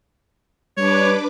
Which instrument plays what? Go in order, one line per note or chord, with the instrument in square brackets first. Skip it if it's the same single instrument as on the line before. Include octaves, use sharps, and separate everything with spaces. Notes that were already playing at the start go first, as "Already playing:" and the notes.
[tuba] G3 [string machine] D4 B4 D6 [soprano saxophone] C#5